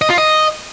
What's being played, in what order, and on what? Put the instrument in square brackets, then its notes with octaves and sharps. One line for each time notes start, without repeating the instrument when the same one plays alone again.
[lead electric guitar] D#5
F4
D#5